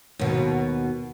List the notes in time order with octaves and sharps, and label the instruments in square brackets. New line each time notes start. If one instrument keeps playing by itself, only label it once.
[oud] D#2 B2